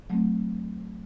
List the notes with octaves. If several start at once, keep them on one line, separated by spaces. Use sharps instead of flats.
F#3 A3 C4